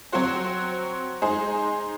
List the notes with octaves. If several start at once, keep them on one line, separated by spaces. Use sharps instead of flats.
F#3 C4 F#4 C5
G#3 D#4 G#4 C5